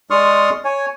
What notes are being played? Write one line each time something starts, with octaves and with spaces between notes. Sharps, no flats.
G#3 D5 C6 C#6 D#6 F6
C#5 G#5